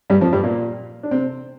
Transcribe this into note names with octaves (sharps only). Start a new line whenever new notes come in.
G2 G3
F2 F3
G2 G3
A#2 A#3
D4
C3 C4